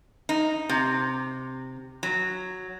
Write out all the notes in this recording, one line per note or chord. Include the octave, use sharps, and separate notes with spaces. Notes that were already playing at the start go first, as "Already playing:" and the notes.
D#4
C3
F#3